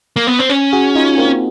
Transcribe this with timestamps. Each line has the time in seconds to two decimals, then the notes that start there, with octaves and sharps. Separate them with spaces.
0.16 A#3
0.27 B3
0.39 C4
0.49 C#4
0.73 F#4 G#4
0.95 D#4 F4
1.18 A#3 C4